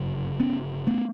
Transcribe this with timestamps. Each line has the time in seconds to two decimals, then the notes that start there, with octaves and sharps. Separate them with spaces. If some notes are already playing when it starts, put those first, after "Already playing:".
Already playing: G1 F#2 C#3
0.40 B3 C#4
0.87 A3 B3